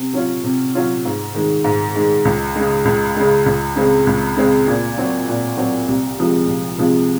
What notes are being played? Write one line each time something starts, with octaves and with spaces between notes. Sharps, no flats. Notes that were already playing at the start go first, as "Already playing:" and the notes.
Already playing: C3
F#3 C#4 F4
C3
F#3 C#4 F4
G#2
D#3 G#3
G#2
D#3 G#3
C#2
C#3 G#3
C#2
C#3 G#3
C#2
C#3 G#3 C4
C#2
C#3 G#3 C4
A#2
F#3 C4 F#4
A#2
F#3 C4 F#4
C2
C3 F3 G#3
C2
C3 F3 G#3